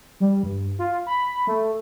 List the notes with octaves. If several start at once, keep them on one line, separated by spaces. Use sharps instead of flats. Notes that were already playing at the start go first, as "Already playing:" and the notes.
G3
G2
F4
B5
A3